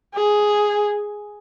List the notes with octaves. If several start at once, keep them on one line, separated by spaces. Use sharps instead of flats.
G#4